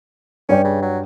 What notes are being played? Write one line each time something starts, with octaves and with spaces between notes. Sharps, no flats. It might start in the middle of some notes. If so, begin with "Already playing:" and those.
G2 C#4 D5 G5
C#3
F#3